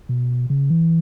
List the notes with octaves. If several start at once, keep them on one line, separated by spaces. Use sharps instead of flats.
B2
C#3
E3